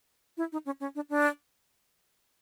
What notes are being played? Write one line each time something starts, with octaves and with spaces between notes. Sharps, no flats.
E4
D#4
C#4
C#4
D4
D4